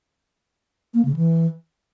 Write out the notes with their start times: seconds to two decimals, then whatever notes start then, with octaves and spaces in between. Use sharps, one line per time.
0.94 A#3
1.05 C#3
1.16 E3